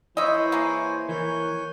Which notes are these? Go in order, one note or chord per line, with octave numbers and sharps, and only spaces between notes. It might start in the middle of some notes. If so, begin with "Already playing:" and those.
E3 E4 C5 C#5 D#5 E5 G#5
G#3 A#3
E3 A#4 C#5 G#5 G6